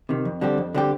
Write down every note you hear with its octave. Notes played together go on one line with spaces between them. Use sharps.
C3 D#3
F2
D3 G3 C4 G4
F2
D3 G3 C4 G4